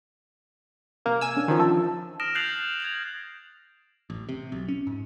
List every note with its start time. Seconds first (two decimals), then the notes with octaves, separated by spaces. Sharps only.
1.06 C3 A#3
1.21 G#5 E6
1.36 C#4 D4
1.48 D#3 F3
1.59 A5 E6
2.20 D#6 F6 A#6 D7 E7
2.35 F#6 G6 A6 C7 F7 F#7
2.80 G#6 F7 F#7
4.10 A1
4.29 C3
4.52 B1
4.68 C#4
4.87 G#2